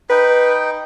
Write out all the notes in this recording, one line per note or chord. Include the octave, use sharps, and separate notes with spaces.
D#4 B4 G5